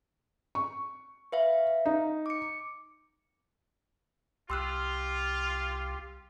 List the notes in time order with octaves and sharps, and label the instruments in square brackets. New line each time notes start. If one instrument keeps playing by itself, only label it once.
[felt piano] C#6
[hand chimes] B4 E5 F5
[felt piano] D#4
[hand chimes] D6 C#7
[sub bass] C2 [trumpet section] F4 [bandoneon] G4 [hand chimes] C6 E6 F#6